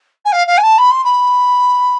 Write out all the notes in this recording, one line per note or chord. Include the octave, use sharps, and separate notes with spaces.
G#5
F5
F5
G#5
A5
B5
C6
B5